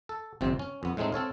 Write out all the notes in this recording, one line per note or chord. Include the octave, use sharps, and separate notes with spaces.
A4
G1 F2 C3 C4
C#4
F2 B3
A2 G#3 A3 C4 D#4
C4 A4 C#5 F5